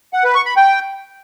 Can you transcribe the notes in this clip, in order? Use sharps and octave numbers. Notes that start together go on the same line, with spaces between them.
F#5
B4
C#6
B5
G5